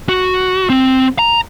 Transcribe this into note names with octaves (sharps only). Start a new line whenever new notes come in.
F#4
C4
A#5